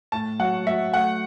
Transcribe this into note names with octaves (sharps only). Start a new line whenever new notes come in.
A2 A5
F#3 F#5
F#3 E5
A3 F#5